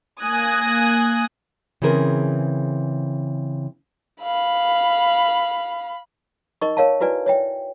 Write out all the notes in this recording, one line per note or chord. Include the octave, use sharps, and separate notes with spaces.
A#3 G#5 D#6 F#6 G#6 A#6
C#3 E3 C4 G#4 A#4 B4
F5 B5
D#4 A#4 D#5 C#6
A#4 C#5 F5 A5
E4 F#4 B4 D5 G#5
C#5 E5 G5